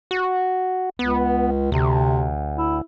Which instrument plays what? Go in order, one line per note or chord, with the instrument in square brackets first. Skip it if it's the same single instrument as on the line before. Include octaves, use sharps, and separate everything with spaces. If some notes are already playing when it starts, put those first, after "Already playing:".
[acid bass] F#4
[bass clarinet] C#2 [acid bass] B3
[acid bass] D2 [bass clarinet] C3
[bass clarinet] E4